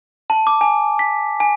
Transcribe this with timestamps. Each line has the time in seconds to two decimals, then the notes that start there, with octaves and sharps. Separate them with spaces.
0.30 A5
0.47 D6
0.61 G#5
0.99 B6
1.40 G#5